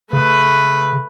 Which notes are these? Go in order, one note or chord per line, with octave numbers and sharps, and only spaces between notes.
C#3 A3 B4